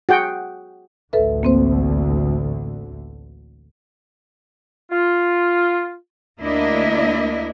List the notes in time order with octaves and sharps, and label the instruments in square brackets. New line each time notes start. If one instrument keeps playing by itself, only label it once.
[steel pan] F#4 G#4 G5
[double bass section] A1 D2 D3 [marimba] A4 B4 E5
[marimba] A#3 C4 C5
[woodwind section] F4
[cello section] D2 A#3 D4 E4 D#5